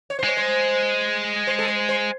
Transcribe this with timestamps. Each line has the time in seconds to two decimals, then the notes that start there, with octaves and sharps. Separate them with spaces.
0.10 C#5
0.19 C5
0.24 G#3 C#5
0.37 C5
1.47 C5
1.59 A4
1.68 C5
1.89 C5